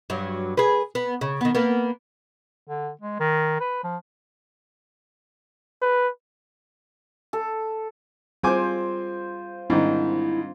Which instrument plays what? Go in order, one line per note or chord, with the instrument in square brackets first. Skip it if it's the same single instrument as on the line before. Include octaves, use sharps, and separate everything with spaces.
[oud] G2 F#3
G#4 B4
B3
C#3
D#3 B3
A#3 B3
[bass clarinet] D3
G#3
D#3
B4
F3
[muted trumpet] B4
[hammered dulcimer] A4
[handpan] G3 G#4 [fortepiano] C4 G#5 D6 [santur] F4 C5
[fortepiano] G#2 D#3 [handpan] G3 C4 D4 [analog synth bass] E4